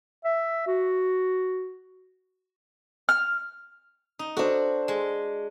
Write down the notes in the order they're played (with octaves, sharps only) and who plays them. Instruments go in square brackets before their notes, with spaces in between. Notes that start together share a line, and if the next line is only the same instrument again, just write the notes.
[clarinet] E5
F#4
[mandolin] F6
[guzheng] D#4
[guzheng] D4 F#4 [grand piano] A4 C5
[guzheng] G#3